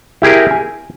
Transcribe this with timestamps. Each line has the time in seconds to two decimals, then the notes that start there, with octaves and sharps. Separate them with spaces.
0.22 E4 G4 G#4 A#4
0.51 G#5